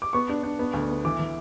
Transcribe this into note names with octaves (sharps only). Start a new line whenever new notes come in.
D6
B3 C#6
D4
D4
B3
D2
B3
E3 D6
E3